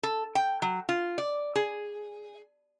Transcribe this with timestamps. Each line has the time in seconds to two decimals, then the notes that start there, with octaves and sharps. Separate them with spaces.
0.03 A4
0.35 G5
0.62 F#3
0.89 F4
1.18 D5
1.55 G#4